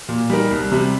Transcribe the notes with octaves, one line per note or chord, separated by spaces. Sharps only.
A#2
G3 D#4 A#4
C2
C3 G3